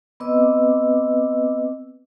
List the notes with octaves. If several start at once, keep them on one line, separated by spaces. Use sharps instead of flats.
B3 C4 B4 D#5 D6 E6